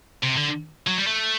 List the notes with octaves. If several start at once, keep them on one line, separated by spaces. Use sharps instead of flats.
C3
D3
F#3
G3
A3